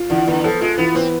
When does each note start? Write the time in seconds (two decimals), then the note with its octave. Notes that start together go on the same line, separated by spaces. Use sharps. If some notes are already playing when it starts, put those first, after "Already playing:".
Already playing: F4
0.10 D3 E3
0.27 D3 B3
0.44 F3 A4
0.61 G#3 F4
0.78 E3 B3
0.95 B3 C4